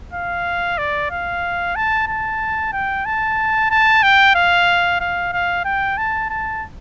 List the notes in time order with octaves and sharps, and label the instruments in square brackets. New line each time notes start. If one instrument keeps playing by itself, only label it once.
[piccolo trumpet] F5
D5
F5
A5
A5
G5
A5
A5
G5
F5
F5
F5
G5
A5
A5